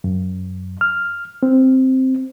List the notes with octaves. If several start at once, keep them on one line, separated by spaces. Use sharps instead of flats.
F#2
F6
C4